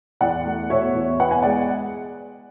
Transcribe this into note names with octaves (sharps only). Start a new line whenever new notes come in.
E2 D5 F#5
A3
B2 C#5 E5
E2
B3 F#5
G#5
G#3 D5 F#5